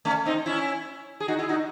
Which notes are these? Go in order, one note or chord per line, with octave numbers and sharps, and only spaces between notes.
A3 C#4
C4 D#4
C#4 E4
G#4
D#4 F#4
E4 G#4
D#4 F#4